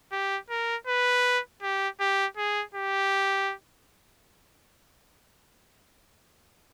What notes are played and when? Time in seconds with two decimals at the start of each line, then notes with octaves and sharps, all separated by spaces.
0.12 G4
0.50 A#4
0.87 B4
1.62 G4
2.00 G4
2.37 G#4
2.75 G4